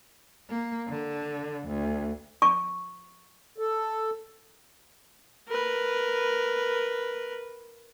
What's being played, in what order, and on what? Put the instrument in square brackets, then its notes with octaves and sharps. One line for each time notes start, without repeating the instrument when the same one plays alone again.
[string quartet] A#3
D3
D2
[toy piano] C#6
[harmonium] A4
[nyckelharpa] A#4 B4